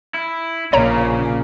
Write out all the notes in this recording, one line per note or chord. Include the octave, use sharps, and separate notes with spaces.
E4
A#1 C#3 A#3 C#5 A#5